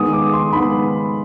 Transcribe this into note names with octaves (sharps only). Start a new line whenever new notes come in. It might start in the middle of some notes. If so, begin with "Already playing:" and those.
Already playing: D#3 G#3 B3 D#6
D6
C6
D#3 G#3 B3 B5